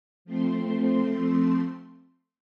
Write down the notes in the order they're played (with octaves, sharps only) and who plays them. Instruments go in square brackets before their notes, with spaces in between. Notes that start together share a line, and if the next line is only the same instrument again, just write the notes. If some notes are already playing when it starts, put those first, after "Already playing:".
[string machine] F3 A3 C4 C6